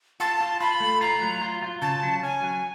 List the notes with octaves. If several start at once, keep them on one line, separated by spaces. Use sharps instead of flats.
F4 A5
F4
F4 B5
A3
F4 A#5
F#3
F4
F4
C#3 A5
F#3
C#4 G#5
F#3